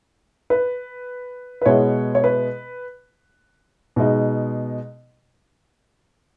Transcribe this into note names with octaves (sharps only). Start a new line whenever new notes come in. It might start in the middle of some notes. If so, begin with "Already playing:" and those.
B4
B4
B2 G#3 B3 E4 C#5
C#5
B4
B2 G#3 D#4